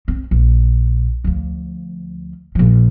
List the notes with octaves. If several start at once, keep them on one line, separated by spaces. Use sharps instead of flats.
C4
A#1
D2 F3
A#1 F3